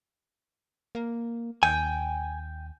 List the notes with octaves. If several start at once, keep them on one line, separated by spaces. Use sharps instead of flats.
A#3
D#2 G5 G#5